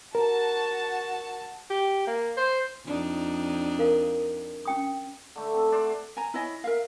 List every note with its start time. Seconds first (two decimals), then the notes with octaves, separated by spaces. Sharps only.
0.15 F#4 A#4 A5
1.70 G4
2.07 A#3
2.37 C5
2.85 F2 D4 D#4
3.79 A#4 F5
4.65 C#4 G5 D#6
5.36 D3 A3
5.54 C4
5.72 C5 D5 F#5
6.17 G#5 A#5
6.34 E4 C#5 D#5 G#5
6.64 A#4 E5 F5